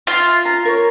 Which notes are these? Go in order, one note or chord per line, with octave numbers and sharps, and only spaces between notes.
F4 E5 C6
A#5
A#4 C#5